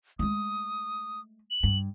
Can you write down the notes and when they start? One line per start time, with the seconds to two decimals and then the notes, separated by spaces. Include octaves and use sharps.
0.19 G#3 A3 D#6
1.51 F#7
1.63 G2